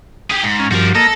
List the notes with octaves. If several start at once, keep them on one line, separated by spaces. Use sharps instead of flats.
G4 G#4
G#2
C#4 F6
G2 F3 F#4 A#4
A#3 A4 D#5 A#5